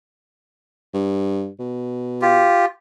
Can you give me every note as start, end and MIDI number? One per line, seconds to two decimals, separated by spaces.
0.94 1.49 43
1.59 2.49 47
2.22 2.66 65
2.22 2.66 67